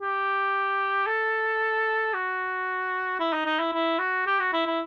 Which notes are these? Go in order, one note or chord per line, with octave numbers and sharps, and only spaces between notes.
G4
A4
F#4
E4
D#4
D#4
E4
E4
F#4
G4
F#4
E4
E4